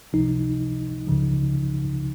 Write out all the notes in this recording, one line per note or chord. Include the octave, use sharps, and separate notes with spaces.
C#2 C3 F3 D#4
C#2 C#3 F3